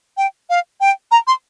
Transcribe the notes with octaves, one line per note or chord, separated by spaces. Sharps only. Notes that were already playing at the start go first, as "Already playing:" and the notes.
G5
F5
G5
A#5
C6